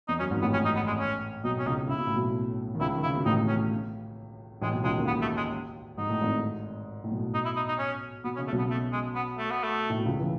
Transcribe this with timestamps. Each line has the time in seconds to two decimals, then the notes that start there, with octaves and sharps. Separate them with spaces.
0.08 E2 D#4
0.19 F#2 C#4
0.30 G#1 G#2
0.41 A1 A2 B3
0.53 C#4
0.65 D#4
0.76 B3
0.87 G#3
0.99 C#4
1.44 B1 B2 D#4
1.59 C#4
1.66 C#2 C#3 D#4
1.89 C#3 E4
1.99 B2
2.07 A2
2.15 B1 B2
2.75 D#3
2.80 C#2 C#3 E4
2.95 D#3
3.03 C#3 E4
3.16 B2
3.25 A1 A2 D#4
3.48 C#4
4.61 A1 A2 G#3
4.73 B1 B2
4.84 C#2 C#3 G#3
4.96 D#2 D#3
5.07 B3
5.22 A3
5.37 G#3
5.98 G#2 D#4
6.09 A2
6.21 G#1 G#2
7.04 A2
7.11 B1 B2
7.34 D#4
7.45 E4
7.56 D#4
7.68 D#4
7.79 C#4
8.24 B2 B3
8.36 C#4
8.38 C#3
8.47 A3
8.52 B1 B2
8.58 B3
8.70 A3
8.92 G#3
9.15 B3
9.38 A3
9.50 B3
9.63 A3
9.89 A2
9.98 B2
10.05 C#2 C#3
10.19 E3